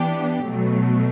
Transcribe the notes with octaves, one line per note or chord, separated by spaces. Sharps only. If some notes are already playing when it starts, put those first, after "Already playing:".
Already playing: E3 B3 D4 G4
B2 F#3 A3